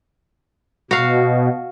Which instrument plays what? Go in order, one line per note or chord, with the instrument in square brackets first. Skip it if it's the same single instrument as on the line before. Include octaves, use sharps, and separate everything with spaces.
[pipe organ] B2 [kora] F#4 F5